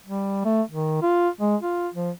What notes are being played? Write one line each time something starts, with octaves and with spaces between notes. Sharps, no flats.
G3
A3
D#3
F4
G#3
F4
F3